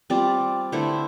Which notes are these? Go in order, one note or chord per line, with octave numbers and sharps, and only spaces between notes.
G3 C4 F4 D5
D3 A3 E4 C5